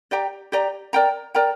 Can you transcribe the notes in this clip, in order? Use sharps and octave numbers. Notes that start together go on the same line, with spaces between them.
G4 D5 G5 A#5
G4 D5 G5 A#5
A#4 D5 G5 A#5
A#4 D5 G5 A#5